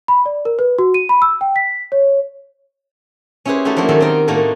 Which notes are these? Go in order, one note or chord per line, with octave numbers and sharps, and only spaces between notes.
B5
D5
A#4
B4
F#4
D#7
B5
E6
G5
B6
C#5
C#4 E4 G4 G#4 B4 C5
A3 D#4 E4 F#4 G4
F3 A3 A#3 D4 E4 F#4
D#3 F#3 G#3 G4 A4
C4 D#4 A#4 G5
A2 A3 A#3 D#4 F#4